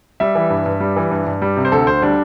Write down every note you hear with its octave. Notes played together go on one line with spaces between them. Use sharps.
G3 E5
E3
G2
G2
G3
E3
G2
G2
G3
C3
C5
D2 A4
D2 C5
G3 D4